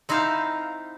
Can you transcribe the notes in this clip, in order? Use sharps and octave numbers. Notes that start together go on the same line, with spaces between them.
C4 D#4 E4 C5 F5